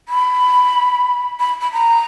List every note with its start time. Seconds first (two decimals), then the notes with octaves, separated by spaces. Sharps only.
0.09 B5
1.40 B5
1.62 B5
1.73 A#5